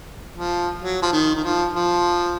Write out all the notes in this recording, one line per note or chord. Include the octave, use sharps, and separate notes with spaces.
F3
F#3
F3
D#3
D#3
F3
F3